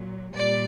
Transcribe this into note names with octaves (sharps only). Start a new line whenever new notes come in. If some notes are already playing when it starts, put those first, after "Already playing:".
Already playing: A#2 F#3
A#2 G3 D5